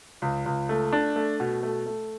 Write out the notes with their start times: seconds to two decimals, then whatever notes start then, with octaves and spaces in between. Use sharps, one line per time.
0.22 C#2
0.46 C#2
0.69 A3
0.93 D4
1.16 A3
1.40 B2
1.63 A3
1.86 A3